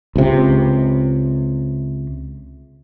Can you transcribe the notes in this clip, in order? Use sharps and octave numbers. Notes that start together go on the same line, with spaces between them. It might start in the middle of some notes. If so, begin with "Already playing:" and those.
C#2 C3